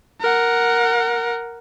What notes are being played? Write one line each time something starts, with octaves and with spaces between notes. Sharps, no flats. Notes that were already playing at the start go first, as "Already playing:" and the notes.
A#4 F#5